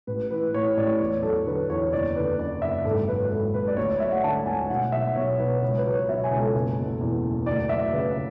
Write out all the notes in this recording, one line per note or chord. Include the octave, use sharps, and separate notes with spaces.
A1 B4
E3 B4
A2 C#5
A1 D5
E2 C#5
F#3 A4
D3 B4
E2 C#5
F#1 D5
D3 B4
F#2 D5
F#1 E5
G#1 A4
F#3 B4
G#2 A4
G#1 B4
D5
D2 C#5
D5
F#3 E5
F#5
D3 A5
D2 G#5
B1 F#5
F#3 E5
B2 C#5
B1 B4
C#2 C#5
B4
F#3
C#5
B2 E5
G#5
C#2
A4
F#1
B2
E2
F#1
D2 D5
F#3 E5
C#3 B4